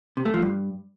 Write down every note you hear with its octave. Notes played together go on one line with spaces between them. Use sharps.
C3
A3
F3
G2